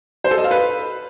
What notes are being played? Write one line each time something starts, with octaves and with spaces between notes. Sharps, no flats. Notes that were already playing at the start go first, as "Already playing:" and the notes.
C5
A4
D#5
F5
B4